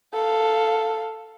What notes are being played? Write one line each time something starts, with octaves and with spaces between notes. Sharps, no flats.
A4 F5